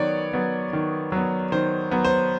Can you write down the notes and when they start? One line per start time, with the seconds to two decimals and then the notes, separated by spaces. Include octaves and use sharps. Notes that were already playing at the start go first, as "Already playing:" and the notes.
Already playing: D#3 F#3 B3 C#5 D5
0.33 F#3 B3
0.73 D#3
1.12 F#3 B3
1.52 D#3 C5
1.91 F#3 B3
2.04 C5